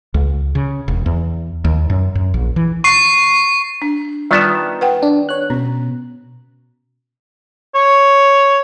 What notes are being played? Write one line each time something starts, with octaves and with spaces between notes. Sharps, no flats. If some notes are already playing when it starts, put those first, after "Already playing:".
C#2
C#3
E1
E2
D#2
F#2
F#2
A#1
E3
C#6 C7
D4
D#3 G3 B3 F4 D5 A5
B4 F#5 G5
D4
C#5 F#6
B2 C#4
C#5